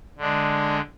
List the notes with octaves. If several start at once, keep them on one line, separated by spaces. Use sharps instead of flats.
D3 G#3 D4